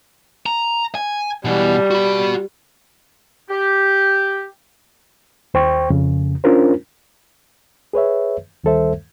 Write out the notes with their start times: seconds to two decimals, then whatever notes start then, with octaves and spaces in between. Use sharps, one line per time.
0.46 A#5
0.95 G#5
1.45 B2 E3 G3
1.91 F#4 B5
3.50 G4
5.54 D#2 C5 G5 C#6
5.90 F2 C#3
6.44 C#4 D4 F4 A#4 C5
7.93 G#4 B4 C#5 E5
8.64 D2 D#3 G3 A4 C5 E5